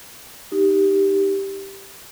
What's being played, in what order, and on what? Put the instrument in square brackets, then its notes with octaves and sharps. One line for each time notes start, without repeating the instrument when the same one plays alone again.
[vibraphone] D#4 G4